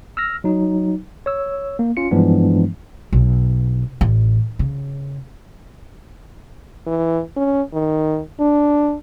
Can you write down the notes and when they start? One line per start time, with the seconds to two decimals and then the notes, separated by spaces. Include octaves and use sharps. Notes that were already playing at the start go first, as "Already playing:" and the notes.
0.17 E6 F6 A#6
0.44 F#3 D#4
1.26 C#5 E6
1.79 A#3
1.97 C#4 F4 C#7
2.11 G2 E3 F3 G#3 B3 D4
3.13 B1
4.01 A1
4.59 C#3
6.87 E3
7.36 C#4
7.73 D#3
8.40 D4